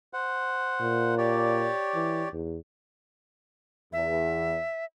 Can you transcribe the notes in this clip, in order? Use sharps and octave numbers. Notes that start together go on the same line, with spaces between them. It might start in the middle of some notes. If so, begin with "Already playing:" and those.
C5 F#5
A#2
G4 C#5 D5
E3
E2
E2 E5